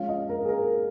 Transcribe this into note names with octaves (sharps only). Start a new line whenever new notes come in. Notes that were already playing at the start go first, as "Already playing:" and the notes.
Already playing: F3 G#3 C#4 F5
D#5
A#4
G#4
A#4